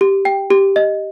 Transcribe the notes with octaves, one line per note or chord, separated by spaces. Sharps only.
G4
G5
G4
D#5